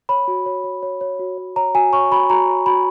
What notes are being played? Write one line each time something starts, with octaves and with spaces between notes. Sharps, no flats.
C#5 B5
F#4
C#5
C#5
C#5
C#5
F#4
C#5
C#5 A#5
F#4 G#5
C#5 C#6
F#4 B5
F#4 A#5
C#5
F#4 B5